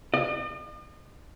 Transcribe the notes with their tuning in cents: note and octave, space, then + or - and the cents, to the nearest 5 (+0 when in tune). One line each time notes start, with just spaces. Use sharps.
D#5 -45